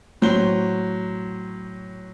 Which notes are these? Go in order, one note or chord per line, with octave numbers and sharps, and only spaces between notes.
A2 F#3 C5 G7